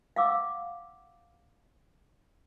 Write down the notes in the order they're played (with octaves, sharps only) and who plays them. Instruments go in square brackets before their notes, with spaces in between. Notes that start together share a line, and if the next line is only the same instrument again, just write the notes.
[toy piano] F5 F#5 D6 E6